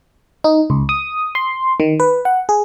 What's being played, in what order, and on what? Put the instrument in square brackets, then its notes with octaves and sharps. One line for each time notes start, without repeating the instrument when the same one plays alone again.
[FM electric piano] D#4
C#2
D#6
C6
D#3
B4
F#5
G#4